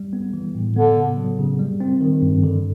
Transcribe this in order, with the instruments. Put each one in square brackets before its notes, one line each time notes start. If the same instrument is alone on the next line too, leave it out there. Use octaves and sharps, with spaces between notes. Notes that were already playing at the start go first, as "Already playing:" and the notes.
Already playing: [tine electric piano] G3
B3
E3
A2
[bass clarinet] D3 [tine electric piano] B3
[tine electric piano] C#3
F#3
C#3
G3
C4
D#3
G2
D3